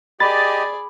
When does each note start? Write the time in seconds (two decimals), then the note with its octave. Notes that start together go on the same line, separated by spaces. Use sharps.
0.20 G4 G#4 D5 D#5 B5 A6